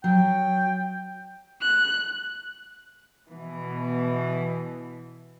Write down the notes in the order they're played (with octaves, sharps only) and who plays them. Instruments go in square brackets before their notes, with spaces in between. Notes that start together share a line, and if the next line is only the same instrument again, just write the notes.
[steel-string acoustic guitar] F#3 [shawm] G5
[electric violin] F#6
[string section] B2 E3